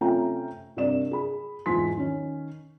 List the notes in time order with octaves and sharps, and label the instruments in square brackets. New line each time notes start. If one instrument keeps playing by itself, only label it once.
[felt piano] C3 A3 C#4 F4 G5 A#5
G2 C3 A#4 D5 E7
G#4 B5
E2 G#2 F4 G#5 C6 B6
D#3 C#4